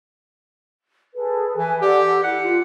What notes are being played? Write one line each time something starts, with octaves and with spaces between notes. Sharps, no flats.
G#4 A4 B4
E3 B4 E5 G#5
G4 A4 D5 F#5
E4 F#5
F4